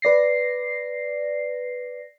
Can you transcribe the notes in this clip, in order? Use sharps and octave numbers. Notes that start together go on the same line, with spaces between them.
B4 D5 A#6 C7